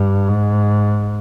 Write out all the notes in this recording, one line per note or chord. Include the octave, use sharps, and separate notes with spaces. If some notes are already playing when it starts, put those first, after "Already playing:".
Already playing: G2
G#2